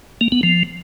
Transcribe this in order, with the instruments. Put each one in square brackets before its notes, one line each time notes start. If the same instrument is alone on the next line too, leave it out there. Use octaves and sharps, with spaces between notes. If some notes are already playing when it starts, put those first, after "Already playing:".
[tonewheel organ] A#3
B3
F3